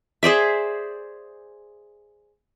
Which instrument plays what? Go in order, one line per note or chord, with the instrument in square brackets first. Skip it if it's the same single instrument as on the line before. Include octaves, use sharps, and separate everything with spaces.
[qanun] G#4 C5 D5 E5